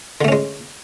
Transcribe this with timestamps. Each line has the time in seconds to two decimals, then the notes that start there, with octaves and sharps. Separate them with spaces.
0.21 D3
0.24 A3
0.28 C#4
0.32 G#3